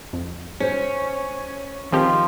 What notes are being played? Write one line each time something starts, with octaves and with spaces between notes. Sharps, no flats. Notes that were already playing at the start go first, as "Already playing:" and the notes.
F2
C#4 C5 C#5
D#3 F3 C4 G4